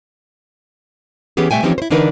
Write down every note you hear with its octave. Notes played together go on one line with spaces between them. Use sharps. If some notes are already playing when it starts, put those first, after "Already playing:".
E3 B3 C#4 G4 G#4
B2 G3 A3 E5 G5 G#5
E3 F3 C4 C#4 D#4 G4
E4 C5
D3 E3 D4 D#4 A#4 B4